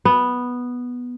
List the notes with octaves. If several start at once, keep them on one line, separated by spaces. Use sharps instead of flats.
B3